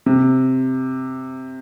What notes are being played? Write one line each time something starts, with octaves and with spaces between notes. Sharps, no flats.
C3